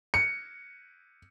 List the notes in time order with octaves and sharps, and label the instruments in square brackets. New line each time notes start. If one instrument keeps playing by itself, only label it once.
[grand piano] C#7